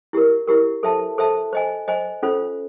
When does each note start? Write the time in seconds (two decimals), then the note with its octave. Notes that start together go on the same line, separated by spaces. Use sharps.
0.13 E4 G4 A#4
0.47 E4 G4 A#4
0.83 A4 C5 E5 A5
1.18 A4 C5 E5 A5
1.53 C5 D#5 G#5
1.88 C5 D#5 G#5
2.23 C#4 F4 A4 C5